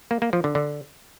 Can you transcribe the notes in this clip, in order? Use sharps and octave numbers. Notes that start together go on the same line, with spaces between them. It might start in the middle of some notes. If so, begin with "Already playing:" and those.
A#3
A#3
F3
D3
D3